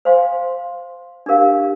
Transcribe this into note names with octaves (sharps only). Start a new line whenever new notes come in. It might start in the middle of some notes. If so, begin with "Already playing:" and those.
C5 F5 G#5 C6
D4 G4 A#4 F5